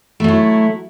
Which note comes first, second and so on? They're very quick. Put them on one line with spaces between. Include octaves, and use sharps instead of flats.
A3 F#3 E4